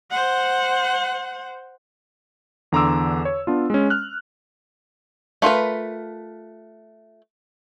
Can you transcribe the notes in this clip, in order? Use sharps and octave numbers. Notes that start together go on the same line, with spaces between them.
C5 F#5
E2 D3 A#5 C6 D6 E6
C#5
B3 D4 F4
G#3 C#4
F6 F#6
A3 F4 A#4 B4